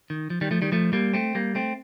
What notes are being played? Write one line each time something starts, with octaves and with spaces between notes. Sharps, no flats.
D#3
F3
D#3 G3
F3 A3
D#3 G3
F3 A3
G3 A#3
A3 C4
G3 A#3
A3 C4